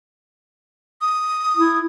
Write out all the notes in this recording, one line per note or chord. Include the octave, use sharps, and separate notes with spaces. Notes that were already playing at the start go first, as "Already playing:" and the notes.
D#6
E4